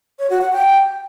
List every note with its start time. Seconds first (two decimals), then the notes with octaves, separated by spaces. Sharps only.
0.19 C#5
0.30 F#4
0.41 F#5
0.52 G5